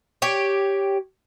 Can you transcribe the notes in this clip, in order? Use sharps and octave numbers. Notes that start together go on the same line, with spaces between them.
G4 C#5